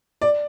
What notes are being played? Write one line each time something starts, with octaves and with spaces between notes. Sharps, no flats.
D5